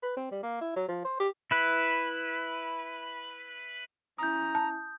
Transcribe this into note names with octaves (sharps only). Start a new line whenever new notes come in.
B4
C4
G3
A#3
E4
F#3
F3
C5
G4
E4 B4
C#4 E4 A#5 D#6 G6
A5